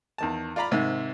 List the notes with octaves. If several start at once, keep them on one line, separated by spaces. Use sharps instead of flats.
E2 D#3 A5
F4 D5 F5 A#5 B5
G#2 C3 D#3